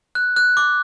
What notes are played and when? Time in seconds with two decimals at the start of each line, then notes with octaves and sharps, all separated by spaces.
0.15 F#6
0.36 F#6
0.57 D6